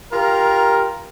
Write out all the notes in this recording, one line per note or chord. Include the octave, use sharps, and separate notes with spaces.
F4 G4 A#4